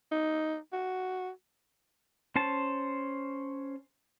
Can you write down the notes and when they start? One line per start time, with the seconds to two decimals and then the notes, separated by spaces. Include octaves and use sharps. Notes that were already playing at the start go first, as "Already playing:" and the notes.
0.12 D#4
0.73 F#4
2.36 C#4 C5 A5